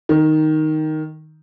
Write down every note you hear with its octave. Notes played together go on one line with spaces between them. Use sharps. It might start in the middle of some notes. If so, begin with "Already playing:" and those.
D#3